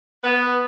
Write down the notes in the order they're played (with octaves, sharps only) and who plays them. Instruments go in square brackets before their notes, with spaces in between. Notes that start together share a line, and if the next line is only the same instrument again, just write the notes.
[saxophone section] B3